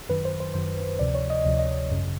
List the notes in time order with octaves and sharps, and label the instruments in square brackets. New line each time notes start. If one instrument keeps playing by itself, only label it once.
[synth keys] F#2 D#3 F#3 B4
C5
C5
F#2 D#3 F#3 C5
D2 C3 F3 D5
C#5
D#5
D2 C3 F3
D#5
G#1 F#2 C#3